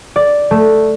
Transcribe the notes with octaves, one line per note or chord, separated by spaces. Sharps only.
D5
A3